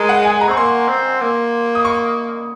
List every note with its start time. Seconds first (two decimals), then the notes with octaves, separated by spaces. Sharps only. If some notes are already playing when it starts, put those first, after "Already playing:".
Already playing: G#3 A#4
0.09 F#5
0.25 G#5
0.41 A#5
0.48 C4 C#6
0.57 A#3 C6
0.88 C4
1.21 A#3
1.75 D#6
1.85 C#6